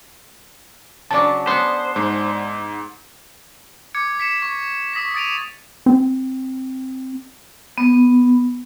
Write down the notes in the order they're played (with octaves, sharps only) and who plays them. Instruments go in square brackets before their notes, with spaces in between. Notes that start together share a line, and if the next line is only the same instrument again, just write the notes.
[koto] C#3 F#3 D4 [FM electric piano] D5 A5
[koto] B3 G#4 F#5 [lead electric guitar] C5
[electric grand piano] G#2
[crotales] D6 G#6 C#7
B6 C#7 E7
C#6
C#6 D#6 A#6 B6
D#6 A6 D7 D#7 F7
[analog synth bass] C4
[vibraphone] B3